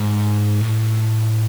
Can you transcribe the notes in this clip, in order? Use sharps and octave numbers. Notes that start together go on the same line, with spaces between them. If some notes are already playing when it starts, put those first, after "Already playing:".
Already playing: G#2
A2